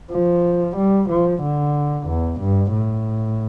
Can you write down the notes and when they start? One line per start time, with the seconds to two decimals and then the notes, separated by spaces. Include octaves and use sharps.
0.12 F3
0.77 G3
1.09 F3
1.43 D3
2.07 E2
2.40 G2
2.73 A2